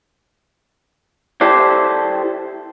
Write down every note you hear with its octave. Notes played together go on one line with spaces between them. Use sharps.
E4 G4 A4 C5 D5